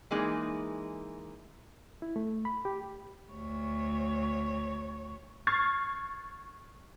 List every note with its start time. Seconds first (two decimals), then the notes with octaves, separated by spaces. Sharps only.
0.11 E3 G#3 A#3 D#4
2.02 E4
2.16 A3
2.45 B5
2.65 G4
3.31 D2 C#5
5.47 C#6 F6 G#6 A6 C7